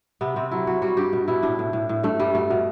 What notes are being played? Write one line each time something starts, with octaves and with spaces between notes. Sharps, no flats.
C3 B3
C3 C4
F#3 E4
F#3 F#4
G3 F#4
G2 G4
B2
B2 E4
A2 D4
A2
A2
A2
G2 A3
G2 G3
B2 A3
B2